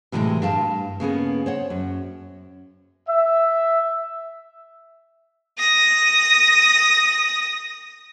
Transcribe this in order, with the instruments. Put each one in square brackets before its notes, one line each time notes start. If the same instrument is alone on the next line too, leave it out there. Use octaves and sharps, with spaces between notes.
[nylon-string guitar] A2 C3 E3 F3 G3 G#3
G2 F5 A5
C#3 A#3 B3 G#4
C5 C#5 F#5
F#2
[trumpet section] E5
[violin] D#6 A#6